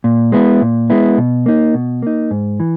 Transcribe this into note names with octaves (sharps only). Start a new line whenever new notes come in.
A#2
G#3 B3 E4
A#2
G#3 B3 E4
B2
A#3 D#4
B2
A#3 D#4
G#2
E3